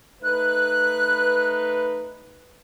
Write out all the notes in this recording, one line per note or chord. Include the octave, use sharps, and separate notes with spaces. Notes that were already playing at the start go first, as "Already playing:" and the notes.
A3 D#4 B4 F#6